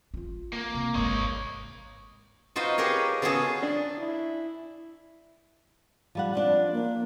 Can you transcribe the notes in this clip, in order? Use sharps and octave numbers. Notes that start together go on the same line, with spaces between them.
E4 F4
A#3
C3
G#1 G#3 C#5 D#5
E2
D#4 F4 F#4 B4 C5
G4 G#4 A#4 B4 C#5 D#5
C#3 B3 F4 F#4 G#4 A4
D4
E4
F3 G3 F#5
F3 D4 D5
A#3